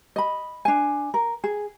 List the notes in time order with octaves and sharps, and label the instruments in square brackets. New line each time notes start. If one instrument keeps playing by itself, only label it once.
[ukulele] D#5 B5
D4 G#5
A#4
G#4